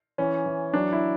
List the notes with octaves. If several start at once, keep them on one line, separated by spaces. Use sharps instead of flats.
E3 C#4
E3
F#3 D4
E4